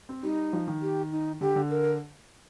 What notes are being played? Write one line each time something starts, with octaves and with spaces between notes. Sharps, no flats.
C4
G3 D#4
F3
D#3
G4
D#4
D3 G4
D3
A#4